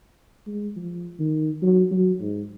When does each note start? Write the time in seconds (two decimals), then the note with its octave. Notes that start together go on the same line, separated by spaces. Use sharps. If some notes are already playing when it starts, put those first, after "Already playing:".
0.47 G#3
0.76 F3
1.19 D#3
1.63 F#3
1.91 F#3
2.20 G#2